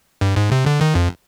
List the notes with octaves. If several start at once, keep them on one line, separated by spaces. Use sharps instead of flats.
G2
G#2
C3
D3
D#3
F2